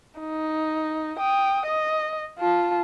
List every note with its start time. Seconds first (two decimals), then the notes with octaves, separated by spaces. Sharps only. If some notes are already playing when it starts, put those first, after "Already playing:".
0.20 D#4
1.18 G5 D#6
1.67 D#5
2.39 F4 A5